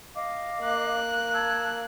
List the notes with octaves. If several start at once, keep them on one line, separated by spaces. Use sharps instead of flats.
D#5 F5 D6
A#3 F#6
A5 E6 G#6